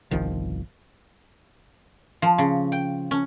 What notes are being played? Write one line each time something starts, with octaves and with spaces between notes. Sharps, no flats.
G1 C2 D#3 F3
F3
C#3
G5
C#4